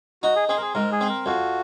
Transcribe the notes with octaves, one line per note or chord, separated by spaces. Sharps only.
D#4 F#4
G#4
C4 G#4
A#4
G#4
G#2 A#4
G#4
C4
A#4
F2 F#4